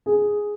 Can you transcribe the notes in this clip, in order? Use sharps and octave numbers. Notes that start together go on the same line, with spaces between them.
G#4